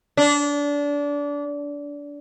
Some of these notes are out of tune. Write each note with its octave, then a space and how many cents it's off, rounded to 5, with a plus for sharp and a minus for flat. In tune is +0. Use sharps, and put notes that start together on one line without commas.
D4 -25